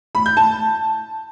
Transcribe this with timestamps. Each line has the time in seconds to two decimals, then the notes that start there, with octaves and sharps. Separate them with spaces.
0.15 B5
0.26 G6
0.37 A5